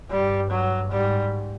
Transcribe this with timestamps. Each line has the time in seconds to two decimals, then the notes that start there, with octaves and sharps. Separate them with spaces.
0.10 G2 G3
0.51 F#3
0.92 G#2 G3